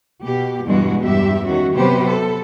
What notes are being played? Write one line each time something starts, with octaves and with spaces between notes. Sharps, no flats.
B2 G4
E2 G2 B2 G#3 F#4
E2 G2 G4 E5
D#3 C#4 F#4
C3 F#3 B3 G4 B4 C5
A4